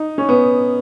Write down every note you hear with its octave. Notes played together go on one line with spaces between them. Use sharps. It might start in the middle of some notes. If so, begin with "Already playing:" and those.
Already playing: D#4
C#4
B3